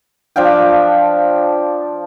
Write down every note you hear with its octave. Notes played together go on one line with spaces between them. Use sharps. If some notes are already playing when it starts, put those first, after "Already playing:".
F3 D4 F5 G5